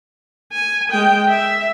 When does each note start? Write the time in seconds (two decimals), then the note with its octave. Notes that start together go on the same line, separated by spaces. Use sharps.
0.52 G#5
0.91 G#3 G5
1.29 E5